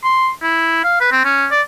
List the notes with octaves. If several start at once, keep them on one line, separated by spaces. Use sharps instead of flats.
C6
E4
F5
B4
C4
C#4
D5